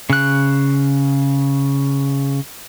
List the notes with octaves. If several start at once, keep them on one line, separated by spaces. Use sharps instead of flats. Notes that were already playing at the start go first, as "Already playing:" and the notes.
C#3 F#6